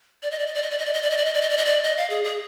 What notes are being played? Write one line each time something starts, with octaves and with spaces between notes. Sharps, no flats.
D5
D#5
D5
D#5
D5
D#5
D5
D#5
D5
D#5
D5
D#5
D5
D#5
D5
D#5
D5
D#5
D5
D#5
F5
G#4
G#4